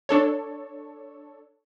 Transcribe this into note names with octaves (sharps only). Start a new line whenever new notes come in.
D4 A4 C#5